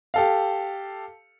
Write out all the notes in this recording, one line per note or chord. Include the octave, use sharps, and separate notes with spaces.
G4 A4 F5